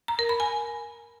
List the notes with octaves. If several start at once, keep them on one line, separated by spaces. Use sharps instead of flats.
A#5
A#4
B5
G#5